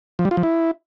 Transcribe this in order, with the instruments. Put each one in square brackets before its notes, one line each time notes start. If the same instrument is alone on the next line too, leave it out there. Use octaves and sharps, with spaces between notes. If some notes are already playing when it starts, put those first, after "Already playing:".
[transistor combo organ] F3
G3
F4
F3
E4